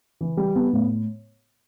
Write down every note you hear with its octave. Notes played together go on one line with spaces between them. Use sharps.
E3
G3
B3
A2